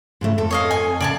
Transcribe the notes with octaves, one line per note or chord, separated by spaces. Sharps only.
G#2 C#3 A3
F2 A4
C#5 D#5 F5
G#5
A2 C#3 D5 G#5 A5